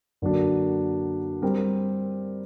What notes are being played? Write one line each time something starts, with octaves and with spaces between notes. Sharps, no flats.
F#2 D3 F#3 A#3 D4
G3 C4 G4 A#4